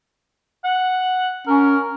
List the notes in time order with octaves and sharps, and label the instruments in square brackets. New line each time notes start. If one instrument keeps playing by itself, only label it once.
[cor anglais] F#5
[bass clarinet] C#4 [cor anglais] A#4